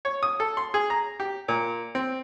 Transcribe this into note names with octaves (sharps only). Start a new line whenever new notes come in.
C#5
D#6
A4
C6
G#4
A#5
G4
A#2
C4